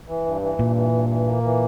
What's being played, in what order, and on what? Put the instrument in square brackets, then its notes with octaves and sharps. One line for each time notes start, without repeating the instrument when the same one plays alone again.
[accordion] E3
G2
E3
[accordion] G2 [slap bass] A#2
[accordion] E3
G2
E3
A#3
E3